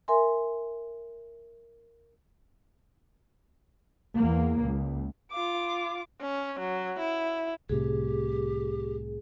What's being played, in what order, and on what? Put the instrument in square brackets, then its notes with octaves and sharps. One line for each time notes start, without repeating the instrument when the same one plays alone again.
[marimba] A#4 E5 G#5 C6
[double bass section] E2 A#3
C#2
[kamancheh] F4 D6
[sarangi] C#4
F#3
E4
[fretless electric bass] C2 A2 C3 [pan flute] G4 [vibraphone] G#4